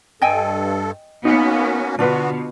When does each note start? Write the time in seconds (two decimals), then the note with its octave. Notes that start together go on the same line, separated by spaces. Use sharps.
0.22 G2 A4 D#5 G5 G#5
1.25 A#3 B3 C#4 D#4 F#4
1.99 B2 D3 B3 D4 F4 F#4 B4